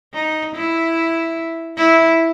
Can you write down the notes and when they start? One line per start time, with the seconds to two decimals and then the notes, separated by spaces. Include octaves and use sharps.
0.14 D#4
0.55 E4
1.77 E4